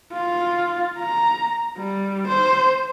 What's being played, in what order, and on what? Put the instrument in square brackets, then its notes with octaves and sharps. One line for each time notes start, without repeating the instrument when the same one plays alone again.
[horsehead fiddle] F4
A#5
G3
C5